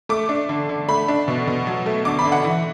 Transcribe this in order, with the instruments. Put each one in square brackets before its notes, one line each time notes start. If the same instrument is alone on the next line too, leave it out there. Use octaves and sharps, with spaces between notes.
[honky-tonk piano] A3 D6
D4
D3
D3
A3 B5
D4
B2
B2
F#3
A3
D3 D6
B5
D3
F#5
E3